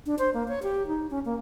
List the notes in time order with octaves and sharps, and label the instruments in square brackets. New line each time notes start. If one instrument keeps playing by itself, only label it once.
[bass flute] D4
C5
A#3
C#5
G4
D#4
C#4
A#3